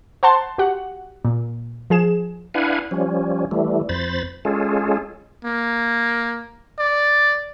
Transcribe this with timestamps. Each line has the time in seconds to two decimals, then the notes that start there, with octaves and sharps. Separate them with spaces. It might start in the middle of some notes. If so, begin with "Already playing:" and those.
0.23 C5 F#5 A5 C6
0.58 F#4 G4 F#5
1.25 A#2
1.90 F3 G#4 E7
2.54 D4 E4 B4 F5 F#5 G#5
2.91 F3 G3 C#4
3.51 E3 G3 A3
3.89 F2 C5 B5 A6
4.45 G#3 C#4 F4 G#4 A4
5.45 A#3
6.79 D5